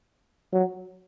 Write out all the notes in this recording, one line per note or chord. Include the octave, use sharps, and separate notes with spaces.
F#3